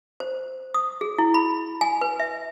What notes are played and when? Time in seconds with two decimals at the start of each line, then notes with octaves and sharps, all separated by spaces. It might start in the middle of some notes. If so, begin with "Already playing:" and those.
0.20 C5
0.74 D#6
1.01 G#4
1.18 E4
1.34 B5
1.81 G#5
2.01 B4
2.20 E5